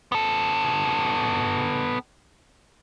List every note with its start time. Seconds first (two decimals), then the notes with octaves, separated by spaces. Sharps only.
0.12 B3 A4